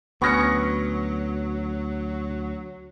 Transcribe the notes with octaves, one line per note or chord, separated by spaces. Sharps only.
D2 F#3 B3 C#4 C#6 A#6 C#7